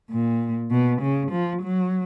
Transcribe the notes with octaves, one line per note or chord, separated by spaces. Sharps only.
A#2
B2
C#3
F3
F#3